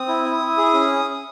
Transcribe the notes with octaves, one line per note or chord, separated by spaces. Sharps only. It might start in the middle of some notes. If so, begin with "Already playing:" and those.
Already playing: C4 D#6
E4
E4
E4
G#4
C#4